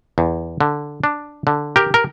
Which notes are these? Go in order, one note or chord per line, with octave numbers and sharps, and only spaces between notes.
E2
D3
D4
D3
G4 A#4
A#4